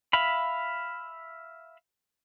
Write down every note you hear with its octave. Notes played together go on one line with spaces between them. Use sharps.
E5 F5 B5